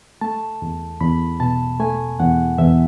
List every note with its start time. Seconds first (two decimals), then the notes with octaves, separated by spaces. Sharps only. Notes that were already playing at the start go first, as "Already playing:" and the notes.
0.21 A3 A5
0.62 E2
1.00 E2 B5
1.40 B2 A5
1.80 A3 G#5
2.20 E2 F#5
2.58 E2 E5